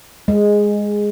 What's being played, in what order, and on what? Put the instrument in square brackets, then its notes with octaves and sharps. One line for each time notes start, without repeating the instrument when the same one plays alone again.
[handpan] G#3